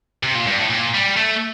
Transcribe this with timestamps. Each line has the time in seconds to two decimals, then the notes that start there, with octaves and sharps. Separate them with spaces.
0.23 C3
0.35 A#2
0.47 G2
0.58 A2
0.70 A#2
0.94 G3
1.17 A3